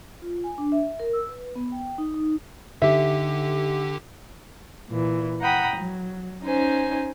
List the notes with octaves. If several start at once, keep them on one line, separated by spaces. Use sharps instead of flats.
F4
G#5
D4
E5
A#4
E6
B4
B3
G5
D#4
D#4
D3 D#4 G4 E5
A#2 E3
F#5 G5 A#5 B5 D#6
F#3
C#4 D#4 C5 G#5